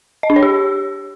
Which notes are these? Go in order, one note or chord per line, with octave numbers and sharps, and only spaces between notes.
D#5
D4
C#5
G4